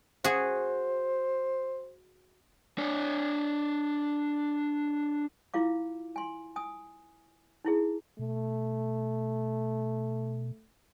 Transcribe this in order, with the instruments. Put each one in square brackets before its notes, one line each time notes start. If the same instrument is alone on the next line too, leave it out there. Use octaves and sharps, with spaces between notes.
[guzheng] F#4 G#4 [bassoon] C5
[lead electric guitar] D4 C#5
[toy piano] E4 F4 F5 D6
G#5 C6
G#5 D#6
D#4 E4 G#4
[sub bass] B2 [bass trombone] A3